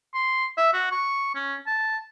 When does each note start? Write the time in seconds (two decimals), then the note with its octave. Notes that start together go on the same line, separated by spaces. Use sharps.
0.14 C6
0.57 E5
0.73 F#4
0.91 C#6
1.35 C#4
1.67 A5